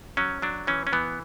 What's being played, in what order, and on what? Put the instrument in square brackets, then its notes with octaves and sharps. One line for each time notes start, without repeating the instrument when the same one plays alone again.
[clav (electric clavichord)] F#3 C#4
F#3 D4
E3 C#4
C#4
E3 B3